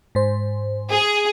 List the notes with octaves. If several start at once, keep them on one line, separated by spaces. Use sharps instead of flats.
G#2 C5
G#4